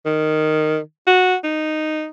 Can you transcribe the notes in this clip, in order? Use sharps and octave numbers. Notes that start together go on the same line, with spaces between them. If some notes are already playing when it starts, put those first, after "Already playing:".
D#3
F#4
D#4